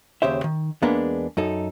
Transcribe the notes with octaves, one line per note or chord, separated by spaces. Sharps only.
D#2 C#3 G4 C5 E5
D#3
E2 G#3 A#3 B3 D4 A#5
F#2 D#4 A4